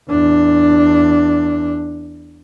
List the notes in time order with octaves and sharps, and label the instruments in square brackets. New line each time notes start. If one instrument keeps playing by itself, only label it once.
[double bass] E2 D4